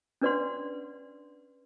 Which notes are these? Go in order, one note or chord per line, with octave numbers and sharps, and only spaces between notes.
C#4 D4 B4 D5 F#5 C6